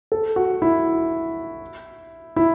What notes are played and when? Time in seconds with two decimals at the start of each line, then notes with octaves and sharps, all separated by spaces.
0.12 A4
0.36 F#4
0.62 E4
2.36 E4